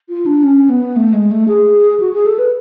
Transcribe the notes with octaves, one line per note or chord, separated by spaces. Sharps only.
F4
D4
C#4
B3
A3
G#3
A3
G#4
F#4
G#4
A4
B4